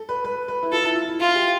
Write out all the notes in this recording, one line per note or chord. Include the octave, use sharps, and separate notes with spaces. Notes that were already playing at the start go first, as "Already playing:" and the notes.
Already playing: A4
B4
B4
B4
E4
F4 A4
E4
F4
E4
E4 F4
G4